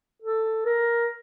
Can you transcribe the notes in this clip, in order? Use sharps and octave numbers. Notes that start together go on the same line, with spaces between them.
A4
A#4